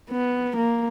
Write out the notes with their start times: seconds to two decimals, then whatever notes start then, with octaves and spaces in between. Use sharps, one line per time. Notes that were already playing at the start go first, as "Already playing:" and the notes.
0.10 B3
0.57 A#3